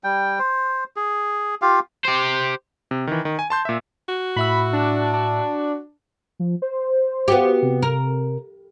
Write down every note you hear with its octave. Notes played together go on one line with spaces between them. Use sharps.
G3 G5
C5
G#4
F4 G4 F5
G4 C5
C3
D#3 E3
D#3
G#5
A5 C6 G6
A#2 E5
F#4
A2 E5 B5 E6
D4
D4
F3
C5
B3 F#4 G4
C3
A#4